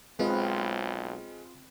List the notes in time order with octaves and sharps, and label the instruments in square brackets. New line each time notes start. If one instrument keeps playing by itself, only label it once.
[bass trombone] B1 [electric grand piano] G#3 [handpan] C4 B4 D#5 [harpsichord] F4